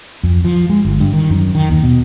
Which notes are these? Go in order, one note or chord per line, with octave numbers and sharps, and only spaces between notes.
F2
F3
G#3
G1
G2
D#3
F#2
D#3
D#2
B2